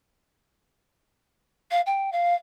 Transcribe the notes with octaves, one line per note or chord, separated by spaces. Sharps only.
F5
G5
F5